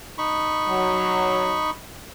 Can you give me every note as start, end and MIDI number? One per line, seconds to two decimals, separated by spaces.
0.18 1.70 63
0.18 1.70 83
0.18 1.70 85
0.68 1.57 54